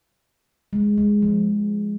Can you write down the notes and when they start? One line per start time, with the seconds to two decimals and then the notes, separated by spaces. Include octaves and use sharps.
0.73 G#3
0.98 G#3
1.22 F3